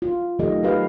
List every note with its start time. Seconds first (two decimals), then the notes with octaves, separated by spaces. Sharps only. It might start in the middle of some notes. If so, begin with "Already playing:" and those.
0.02 F4
0.39 D#3 F#3 A3 G4 A4 D#5
0.63 F#3 F#4 G4 B4 F5